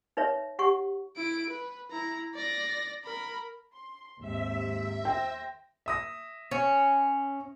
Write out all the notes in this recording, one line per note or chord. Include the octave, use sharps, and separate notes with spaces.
D#4 B4 C#5 E5
G4 F#5 C#6
E4 D7
B4
E4 A#5
D5 A#6
A#4 B5
C6
D#2 G#2 C3 E5
C5 G5 A#6
E5 D#6 A#6
C#4